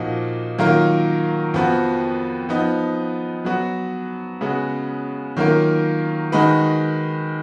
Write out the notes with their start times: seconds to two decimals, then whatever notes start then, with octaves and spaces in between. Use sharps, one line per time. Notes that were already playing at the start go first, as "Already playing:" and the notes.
Already playing: A#2 F3 A#3 D#4 F#4
0.59 D#3 F#3 A#3 F4 A#4
1.54 F2 F3 B3 F#4
2.49 F3 B3 D#4
3.45 F#3 B3 F#4
4.41 C#3 G#3 B3 F#4
5.36 D#3 F#3 A#3 F4 A#4
6.32 D#3 G#3 D#4 F#4 B4